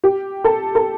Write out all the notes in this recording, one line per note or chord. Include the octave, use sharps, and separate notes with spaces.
G4
A4
A4